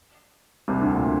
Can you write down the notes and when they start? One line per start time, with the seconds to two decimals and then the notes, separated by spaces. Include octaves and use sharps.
0.68 C2 C3
0.82 D2 D3
0.96 A#2